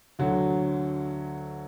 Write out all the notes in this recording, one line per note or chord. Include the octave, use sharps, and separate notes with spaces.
D2 D3 F#3